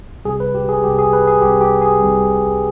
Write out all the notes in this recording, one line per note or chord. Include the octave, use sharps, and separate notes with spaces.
C2 C3 G3 G#4
B4
G4
G#4
C2 C3 G3 G4
G#4
B4
G#4
C2 C3 G3 G4
G4
G#4
C2 C3 G3